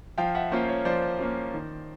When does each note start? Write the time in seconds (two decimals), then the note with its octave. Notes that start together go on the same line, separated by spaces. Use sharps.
0.18 F3 F5 G5
0.35 E5 F#5
0.52 A#3 C#4 F4 C5
0.69 C#5
0.85 F3 C5 D5
1.19 A#3 C#4 F4
1.54 D#3